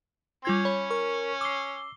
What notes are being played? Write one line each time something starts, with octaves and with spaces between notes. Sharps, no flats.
G3 C#4 F4 G#6
C#5 B5
A#4 C#6
D6 E6 C7 G7